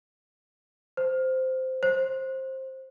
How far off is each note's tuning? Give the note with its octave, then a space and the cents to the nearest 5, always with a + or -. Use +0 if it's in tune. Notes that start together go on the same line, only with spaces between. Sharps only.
C5 -10
C5 +15